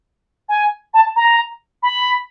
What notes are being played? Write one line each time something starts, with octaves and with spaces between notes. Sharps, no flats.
G#5
A5
A#5
B5